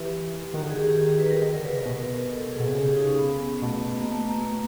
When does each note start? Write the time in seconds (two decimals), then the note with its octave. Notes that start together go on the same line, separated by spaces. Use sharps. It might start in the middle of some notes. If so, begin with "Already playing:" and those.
Already playing: E3 G4
0.54 D#3 F#4
0.62 D3
0.69 D#3 G#4
0.76 G4
0.90 G4
0.98 G#4
1.09 G4
1.20 B4
1.31 A#4
1.42 D#3 A#4
1.53 D3 A#4
1.64 C#3 B4
1.75 C3 A#4
1.86 B2
2.30 A4
2.53 G#4
2.60 B2
2.67 C3
2.74 C#3 G#4
2.86 G4
2.97 D#4
3.07 C#4
3.19 B3
3.62 B2 A3
3.85 A3
3.98 A#3
4.12 A3
4.26 A#3
4.40 A3